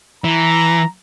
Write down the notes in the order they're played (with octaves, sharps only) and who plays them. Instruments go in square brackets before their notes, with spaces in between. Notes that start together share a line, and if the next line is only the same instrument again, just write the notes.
[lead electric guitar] E3 [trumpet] A#5